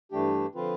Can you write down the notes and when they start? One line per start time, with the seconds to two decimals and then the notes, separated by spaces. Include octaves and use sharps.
0.12 G2 E3 A3 D4 G4
0.55 D3 F3 C4 F4 B4